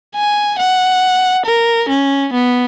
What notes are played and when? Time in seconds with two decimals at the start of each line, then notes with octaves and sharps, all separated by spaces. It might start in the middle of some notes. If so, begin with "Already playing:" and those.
0.16 G#5
0.59 F#5
1.46 A#4
1.89 C#4
2.33 B3